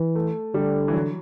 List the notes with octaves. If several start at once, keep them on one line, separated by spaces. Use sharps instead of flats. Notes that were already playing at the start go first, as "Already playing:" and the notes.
Already playing: E3
A3
D3 G3
E3
F#3